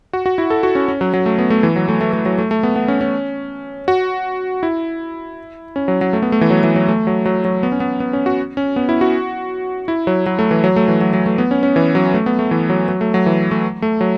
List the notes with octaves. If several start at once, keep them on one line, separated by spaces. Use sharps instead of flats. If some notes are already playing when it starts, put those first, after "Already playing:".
F#4
F#4
E4
A4
F#4
C#4
C#4
F#3
F#3
A3
B3
A3
E3
F#3
A3
A3
A3
F#3
A3
A3
B3
B3
C#4
C#4
F#4
E4
C#4
F#3
F#3
A3
B3
A3
E3
F#3
E3
F#3
A3
F#3
F#3
F#3
B3
C#4
B3
B3
C#4
F#4
C#4
B3
E4
F#4
E4
F#3
F#3
A3
E3
F#3
A3
E3
F#3
F#3
A3
B3
C#4
C#4
E3
F#3
A3
B3
A3
E3
F#3
F#3
A3
F#3
E3
A3
A3
F#3